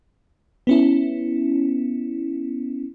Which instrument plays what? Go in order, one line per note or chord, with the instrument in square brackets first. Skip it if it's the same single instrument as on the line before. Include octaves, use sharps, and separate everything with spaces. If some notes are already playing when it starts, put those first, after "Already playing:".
[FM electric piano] B3 C#4 E4